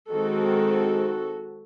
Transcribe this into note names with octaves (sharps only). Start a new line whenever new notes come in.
D#3 G#3 C4 F#4 A4